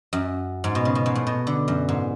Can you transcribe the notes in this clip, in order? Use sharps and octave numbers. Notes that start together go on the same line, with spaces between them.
F#2
G#2
B2
C#3
B2
G#2
A2
B2
D3
F#2
G#2